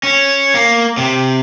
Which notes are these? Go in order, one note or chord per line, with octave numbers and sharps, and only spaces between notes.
C#4
A#3
C3